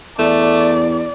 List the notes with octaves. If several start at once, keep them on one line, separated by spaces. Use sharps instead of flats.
E2 A3 D5